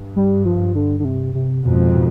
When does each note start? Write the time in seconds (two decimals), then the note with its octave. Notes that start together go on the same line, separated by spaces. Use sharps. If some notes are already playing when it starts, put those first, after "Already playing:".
Already playing: G2
0.16 G3
0.45 F3
0.75 D3
1.00 D3
1.05 C3
1.34 C3
1.64 F2 G#2 B2
1.94 B2